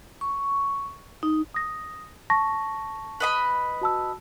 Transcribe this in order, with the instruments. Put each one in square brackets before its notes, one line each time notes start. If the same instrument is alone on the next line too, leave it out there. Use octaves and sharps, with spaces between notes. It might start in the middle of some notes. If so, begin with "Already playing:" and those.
[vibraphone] C#6
D#4
[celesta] D#6 A#6
A5 C#6 A#6
[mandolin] B4 D#5 B5
[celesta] F#4 A5 E6